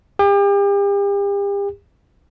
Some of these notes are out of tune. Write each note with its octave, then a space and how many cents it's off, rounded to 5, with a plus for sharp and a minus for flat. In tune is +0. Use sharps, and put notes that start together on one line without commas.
G4 +40